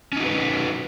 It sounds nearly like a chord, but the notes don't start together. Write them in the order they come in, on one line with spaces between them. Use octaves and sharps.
C#4 D#4 F#4 B4